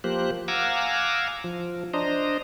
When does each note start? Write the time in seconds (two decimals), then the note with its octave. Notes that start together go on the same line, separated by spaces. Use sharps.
0.04 F3 A#3 G4 C5 F#6
0.48 F5 F#5 G#5 A#5 D6 E6
1.44 F3
1.94 D4 C5 D#5 A#5